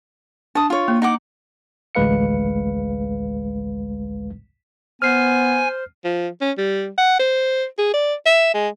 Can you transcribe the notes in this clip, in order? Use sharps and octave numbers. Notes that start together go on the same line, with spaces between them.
D4 A5 D#6
F4 C#5
A#3
D#4 F#5 D6
A1 D2 G#3 B4 F5 C#7
B3 C5 G#5 F6 C7
F3
C#4
G3
F#5
C5
G#4
D5
E5
G#3